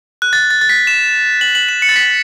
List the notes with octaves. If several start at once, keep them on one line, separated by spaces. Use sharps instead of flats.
F#6
A6
A6
A6
B6
E7
F#7
F#7
E7
C#7
A6
B6